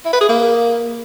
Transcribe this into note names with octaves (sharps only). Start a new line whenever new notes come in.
E4
B4
G#4
A#3